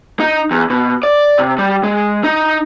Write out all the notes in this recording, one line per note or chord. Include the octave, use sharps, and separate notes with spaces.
D#4
E2
B2
D5
C3
G3
G#3
D#4